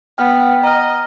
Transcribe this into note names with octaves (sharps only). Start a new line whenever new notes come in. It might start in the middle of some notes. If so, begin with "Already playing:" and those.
B3 G5 F6
D#5 A#5 F6